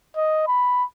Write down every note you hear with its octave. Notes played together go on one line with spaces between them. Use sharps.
D#5
B5